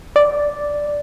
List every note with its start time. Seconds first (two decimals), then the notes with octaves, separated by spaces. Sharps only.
0.16 D5